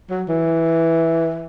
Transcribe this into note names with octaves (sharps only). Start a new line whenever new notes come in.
F#3
E3